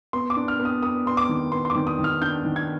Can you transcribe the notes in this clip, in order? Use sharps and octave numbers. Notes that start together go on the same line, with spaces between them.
B3 C6
D6
D4
F6
B3
D#6
B3 D#6
B3 C6
D6
D#3
B3 C6
C6
D6
D#3
D#6
D#3
F6
D4 G6
D#3
G#6